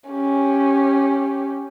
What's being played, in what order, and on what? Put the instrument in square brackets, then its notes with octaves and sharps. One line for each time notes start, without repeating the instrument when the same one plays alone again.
[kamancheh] C#4 G4